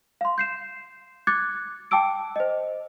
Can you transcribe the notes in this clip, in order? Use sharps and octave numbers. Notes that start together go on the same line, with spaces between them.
F5 C6
G6 C7 E7
D6 F#6 G#6 A6 C#7
G5 A5 D6 E6 D7
C5 D#5